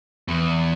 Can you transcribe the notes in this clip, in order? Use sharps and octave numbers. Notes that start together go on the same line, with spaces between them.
E2